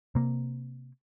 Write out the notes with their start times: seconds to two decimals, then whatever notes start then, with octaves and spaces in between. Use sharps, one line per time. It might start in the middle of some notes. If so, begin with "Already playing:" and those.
0.15 C3 A#3